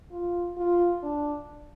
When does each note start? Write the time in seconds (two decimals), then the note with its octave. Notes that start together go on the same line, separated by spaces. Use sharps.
0.12 F4
0.57 F4
1.03 D4